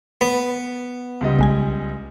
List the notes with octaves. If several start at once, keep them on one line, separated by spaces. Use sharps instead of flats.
B3 B4
C#2 G3 D#5
B1 G#3 G#5